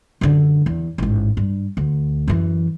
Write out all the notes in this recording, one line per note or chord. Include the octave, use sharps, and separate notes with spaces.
F#2 D3
E2
A1 G#2
G2
D2
F#2 E3